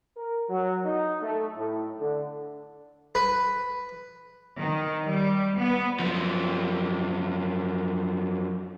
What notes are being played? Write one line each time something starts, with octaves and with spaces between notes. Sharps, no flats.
A#4
F#3
D#4
A3
A2
D3
B4
D#3
G3
B3
F#2 F3